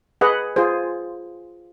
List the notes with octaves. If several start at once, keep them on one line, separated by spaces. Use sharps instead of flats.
G#4 B4 D#5 F#5
F4 G#4 C5